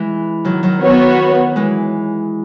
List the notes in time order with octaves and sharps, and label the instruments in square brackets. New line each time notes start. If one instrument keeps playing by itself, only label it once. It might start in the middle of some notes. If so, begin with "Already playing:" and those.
Already playing: [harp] E3 G#3
D#3 F#3
D#3 F#3
[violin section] B3 F#4 C#5
[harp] E3 G#3